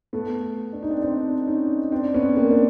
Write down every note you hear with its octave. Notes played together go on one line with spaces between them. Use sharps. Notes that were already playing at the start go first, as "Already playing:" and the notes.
A3 B3
D4
D#4
C4 D4
C4 D4
C#4 D#4
C4 D4
B3 C#4
A#3 C4
D4